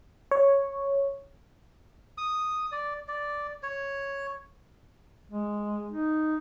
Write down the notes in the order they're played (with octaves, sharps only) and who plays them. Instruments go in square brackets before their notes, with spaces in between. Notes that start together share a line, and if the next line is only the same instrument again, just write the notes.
[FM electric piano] C#5
[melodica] D#6
D5
D5
C#5
[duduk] G#3
D#4